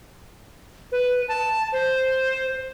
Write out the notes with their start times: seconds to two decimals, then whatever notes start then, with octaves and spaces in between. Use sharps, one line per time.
0.92 B4
1.28 A5
1.72 C5